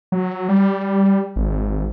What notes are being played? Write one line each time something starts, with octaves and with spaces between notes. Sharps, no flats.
F#3
G3
G#1